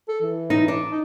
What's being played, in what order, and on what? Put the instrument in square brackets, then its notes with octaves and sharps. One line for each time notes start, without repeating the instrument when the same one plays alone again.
[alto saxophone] A4
E3
[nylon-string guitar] D#4
D4
[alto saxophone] D#4